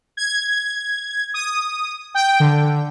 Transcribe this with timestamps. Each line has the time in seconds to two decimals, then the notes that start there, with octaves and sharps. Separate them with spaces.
0.17 G#6
1.34 D#6
2.15 G5
2.40 D3